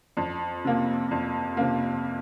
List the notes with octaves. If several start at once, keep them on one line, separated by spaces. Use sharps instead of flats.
F2
C3 A#3
F2
C3 A#3